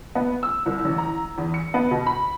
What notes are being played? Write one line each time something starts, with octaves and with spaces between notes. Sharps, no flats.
B3
E6
C2
A1
A#5
E2
C#7
B3
B2
B5